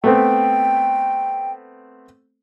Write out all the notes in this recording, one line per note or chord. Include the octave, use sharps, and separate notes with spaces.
A3 B3 C4 G5